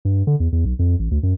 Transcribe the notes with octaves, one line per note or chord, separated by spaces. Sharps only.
G2
D3
E2
E2
B1
F2
A1
D2
F#2